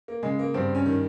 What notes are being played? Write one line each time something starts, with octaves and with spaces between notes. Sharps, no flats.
A#3
C#3 G#3
A#3
G2 C4
C#4
D#3